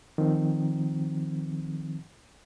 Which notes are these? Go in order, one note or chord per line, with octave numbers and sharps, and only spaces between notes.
D#3 F3 C4